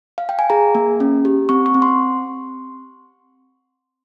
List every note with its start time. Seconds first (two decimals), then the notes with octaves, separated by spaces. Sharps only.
0.18 F5
0.29 G5
0.39 G#5
0.50 G#4 A#5
0.75 A#3
1.00 C#4
1.25 G4
1.49 C4 C#6
1.66 C#6
1.74 C4
1.82 C6